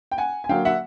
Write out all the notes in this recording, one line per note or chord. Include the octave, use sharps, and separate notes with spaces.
G5
F#5 G#5
G#5
D3 F#3 A#3 F5 G5
E5 F#5